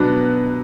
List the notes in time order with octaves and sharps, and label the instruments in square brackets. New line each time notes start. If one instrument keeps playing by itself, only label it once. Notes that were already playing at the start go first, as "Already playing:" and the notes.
Already playing: [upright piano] B2 F#3 B3 D4 [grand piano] B4